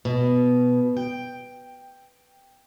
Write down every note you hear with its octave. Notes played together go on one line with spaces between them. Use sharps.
B2
G5